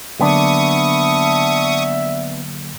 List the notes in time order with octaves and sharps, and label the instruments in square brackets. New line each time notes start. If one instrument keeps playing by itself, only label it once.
[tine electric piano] D3 F#3 A#3 [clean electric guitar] B3 D4 [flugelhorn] E5 [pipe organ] C#6 D#6